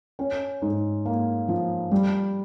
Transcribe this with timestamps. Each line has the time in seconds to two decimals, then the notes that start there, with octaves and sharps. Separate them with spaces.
0.19 C#4
0.62 G#2
1.05 A#3
1.49 F3
1.91 G3